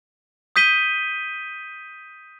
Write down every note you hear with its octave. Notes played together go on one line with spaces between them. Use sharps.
D#6 G6 B6 D#7 G7